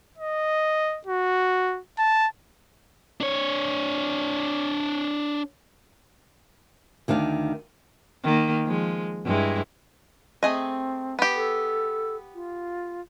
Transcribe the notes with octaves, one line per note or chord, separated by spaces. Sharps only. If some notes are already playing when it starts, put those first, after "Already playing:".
D#5
F#4
A5
D4 C#5
D2 D#3 D4 F5
D#3 A#3
F3 G#3
G2 G#3 E4
A3 C4 G#4 D#5
B3 G4
A4
F4